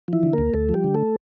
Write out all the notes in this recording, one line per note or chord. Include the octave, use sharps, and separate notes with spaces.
E3 F3 E4
D3
D2 A#3 A#4
D2 A3 A4
F3
G3 G4
D3
A3 A4